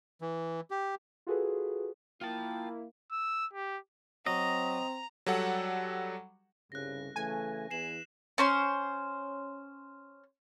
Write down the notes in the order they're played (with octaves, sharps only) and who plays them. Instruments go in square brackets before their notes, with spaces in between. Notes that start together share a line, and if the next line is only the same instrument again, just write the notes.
[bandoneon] E3
G4
[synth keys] F4 F#4 G#4 A4 B4
[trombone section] A#3 E4 [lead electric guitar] F4 A5 [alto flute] G5
[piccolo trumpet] E6
G4
[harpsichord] F#3 [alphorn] C4 [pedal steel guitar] D#5 [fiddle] A#5
[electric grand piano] F#3 G3 A4 F#5
[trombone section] C2 G2 C#3 [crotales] F#6 A#6
[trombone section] C#3 E3 A3 [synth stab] G#5
[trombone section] E2 E3 [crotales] C7 E7 F#7
[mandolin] C#4 C5 C6